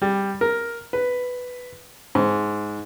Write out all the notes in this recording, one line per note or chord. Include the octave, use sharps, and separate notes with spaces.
G3
A#4
B4
G#2